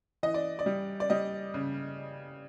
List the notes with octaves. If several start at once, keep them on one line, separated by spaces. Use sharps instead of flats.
E3 D#5
D5
D5
G3
D5
G3 D#5
C#3